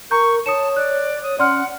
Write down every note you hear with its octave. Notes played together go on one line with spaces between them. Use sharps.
A#4 A#5 C#6 G6
C#5 A5 D#6 C#7 E7
D5 F#6
C#5 D#6
C#4 D5 F#5 C6 F6